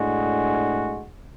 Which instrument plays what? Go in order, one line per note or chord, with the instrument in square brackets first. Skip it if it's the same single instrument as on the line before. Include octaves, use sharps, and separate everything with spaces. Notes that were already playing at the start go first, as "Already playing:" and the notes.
Already playing: [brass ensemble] A2 G#3 D4 F#4